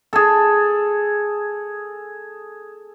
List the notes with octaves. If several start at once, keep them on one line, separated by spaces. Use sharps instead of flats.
G#4 A4